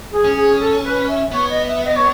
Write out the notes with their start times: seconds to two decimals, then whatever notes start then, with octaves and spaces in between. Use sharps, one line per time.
0.12 G#4
0.24 C#4
0.36 G#4
0.60 A4
0.84 B4
1.08 E5
1.31 B3 C#5
1.50 D#5
1.67 E5
1.85 D#5
1.96 C#5